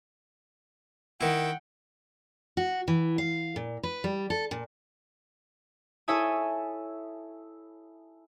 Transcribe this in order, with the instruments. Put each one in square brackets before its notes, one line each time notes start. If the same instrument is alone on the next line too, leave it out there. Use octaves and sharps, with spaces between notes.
[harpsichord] D#3 E4 [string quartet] F#5 G5
[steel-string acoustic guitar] F#4
E3
F5
A#2
B4
G3
A4
A#2
[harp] E4 A4 C#5 E5 G#5 D#6